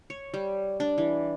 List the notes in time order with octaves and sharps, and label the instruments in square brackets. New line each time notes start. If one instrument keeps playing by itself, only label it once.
[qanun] C#5
G3
D4
E3